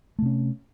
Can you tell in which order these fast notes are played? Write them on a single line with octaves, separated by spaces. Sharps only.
A3 C3 C#4